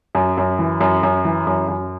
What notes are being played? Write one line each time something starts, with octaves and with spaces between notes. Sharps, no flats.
F#2
F#2
E3
F#2
F#2
E3
F#2
F#2